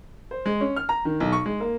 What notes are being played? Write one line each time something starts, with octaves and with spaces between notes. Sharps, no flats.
C5
G#3
C#4
F6
A#5
D#3
B1
C#6
G#3
A#3